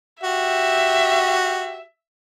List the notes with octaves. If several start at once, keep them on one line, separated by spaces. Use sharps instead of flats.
F#4 G4 E5